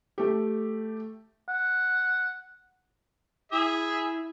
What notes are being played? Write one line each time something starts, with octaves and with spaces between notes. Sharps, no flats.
A3 G4
F#5
E4 G#4 E5